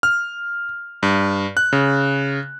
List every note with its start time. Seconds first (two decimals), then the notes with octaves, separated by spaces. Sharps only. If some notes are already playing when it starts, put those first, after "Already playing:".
0.03 F6
1.03 G2
1.57 F#6
1.73 C#3